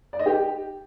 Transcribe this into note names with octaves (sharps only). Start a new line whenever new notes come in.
D5
D#5
G4